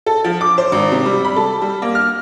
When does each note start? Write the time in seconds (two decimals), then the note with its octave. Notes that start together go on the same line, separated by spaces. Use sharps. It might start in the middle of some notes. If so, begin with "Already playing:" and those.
0.06 A4
0.24 F3
0.41 D6
0.58 C5
0.72 G#1
0.92 C3
1.06 G3
1.24 B5
1.36 A4
1.62 G3
1.82 A#3
1.95 F6